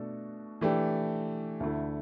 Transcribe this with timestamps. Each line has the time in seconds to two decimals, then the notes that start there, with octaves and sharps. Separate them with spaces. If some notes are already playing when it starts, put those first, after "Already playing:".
Already playing: B2 A3 D4 F#4 A4
0.61 E3 A3 D4 G4
1.60 D2 D3 A3 E4